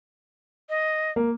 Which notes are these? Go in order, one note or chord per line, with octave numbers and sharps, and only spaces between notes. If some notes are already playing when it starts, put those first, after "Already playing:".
D#5
A#3